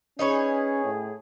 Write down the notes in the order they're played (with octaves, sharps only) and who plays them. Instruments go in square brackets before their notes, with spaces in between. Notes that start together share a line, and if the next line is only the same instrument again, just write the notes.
[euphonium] C#4 [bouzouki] D#4 B4 C#5 [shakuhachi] G#4
[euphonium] A2